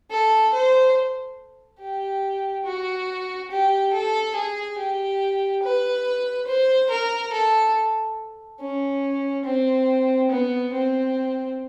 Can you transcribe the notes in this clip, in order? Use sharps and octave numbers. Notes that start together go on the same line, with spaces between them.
A4
C5
G4
F#4
G4
A4
G#4
G4
B4
C5
A#4
A4
C#4
C4
B3
C4